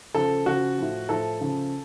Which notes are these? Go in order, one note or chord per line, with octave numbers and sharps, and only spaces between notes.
C#3 F3 A4
C#3 F3 F#4
A2 F3
A2 F3 A4
C#3 F3